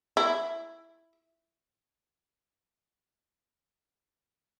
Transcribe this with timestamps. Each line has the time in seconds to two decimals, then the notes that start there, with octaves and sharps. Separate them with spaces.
0.17 E4